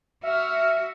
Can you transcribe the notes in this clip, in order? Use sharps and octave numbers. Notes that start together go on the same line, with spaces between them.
F#4 E5 F6